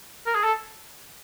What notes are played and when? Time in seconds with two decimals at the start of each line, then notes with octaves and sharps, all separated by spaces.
0.27 A#4
0.35 G#4
0.44 A4